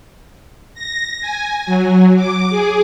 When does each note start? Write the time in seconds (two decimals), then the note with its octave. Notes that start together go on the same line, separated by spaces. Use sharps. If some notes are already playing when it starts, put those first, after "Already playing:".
0.74 A#6
1.21 G#5
1.66 F#3
2.16 D6
2.50 G#4